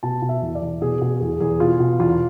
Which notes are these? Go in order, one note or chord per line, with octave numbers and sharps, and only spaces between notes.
B2 A5
B2
E5
E2
D5
E2
B2 G#4
B2 G#4
E2 G#4
E2 G#4
B2 F4
B2
E2 F4